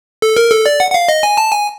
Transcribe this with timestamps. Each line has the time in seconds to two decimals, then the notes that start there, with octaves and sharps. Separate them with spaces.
0.22 A4
0.37 A#4
0.51 A4
0.66 D5
0.80 F#5
0.90 F#5
0.94 F5
1.09 D#5
1.23 G#5
1.37 A5
1.52 G#5